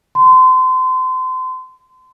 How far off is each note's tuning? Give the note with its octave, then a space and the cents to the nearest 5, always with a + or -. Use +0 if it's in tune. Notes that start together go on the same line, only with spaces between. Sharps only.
C6 -30